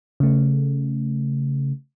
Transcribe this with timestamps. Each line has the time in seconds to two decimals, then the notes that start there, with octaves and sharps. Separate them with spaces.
0.20 C#3 A3